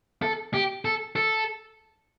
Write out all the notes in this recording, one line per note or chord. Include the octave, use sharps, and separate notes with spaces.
A4
G4
A4
A4